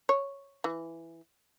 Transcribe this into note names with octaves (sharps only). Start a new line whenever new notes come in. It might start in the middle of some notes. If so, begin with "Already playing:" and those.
C#5
E3